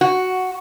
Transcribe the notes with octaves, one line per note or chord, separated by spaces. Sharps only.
F#4